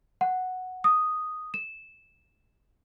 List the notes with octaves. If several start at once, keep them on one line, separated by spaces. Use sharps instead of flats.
F#5
D#6
E7